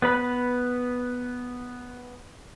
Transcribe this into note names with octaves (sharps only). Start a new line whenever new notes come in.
B3 B4 B5